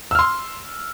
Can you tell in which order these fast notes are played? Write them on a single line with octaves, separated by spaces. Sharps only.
E6 F6 C6